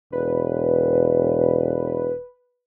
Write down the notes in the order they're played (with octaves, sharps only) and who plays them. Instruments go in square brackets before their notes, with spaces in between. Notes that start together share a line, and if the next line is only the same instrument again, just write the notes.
[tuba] E1 [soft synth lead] B4